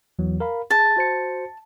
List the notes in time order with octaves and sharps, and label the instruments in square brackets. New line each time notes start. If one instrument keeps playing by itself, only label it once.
[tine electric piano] E2 E3 F#3
A#4 F5 B5
[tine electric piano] G#4 [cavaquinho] A5
[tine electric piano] F#4 C5 C#7